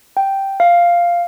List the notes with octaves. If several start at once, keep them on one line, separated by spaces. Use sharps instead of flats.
G5
F5